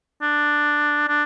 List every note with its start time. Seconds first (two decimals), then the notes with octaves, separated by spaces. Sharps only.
0.22 D4
1.08 D4